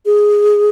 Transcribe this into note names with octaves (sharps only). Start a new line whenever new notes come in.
G#4